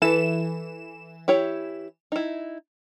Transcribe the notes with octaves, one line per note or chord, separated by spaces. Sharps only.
E3 A4 B4 E7
E4 G4 C#5
D#4 E4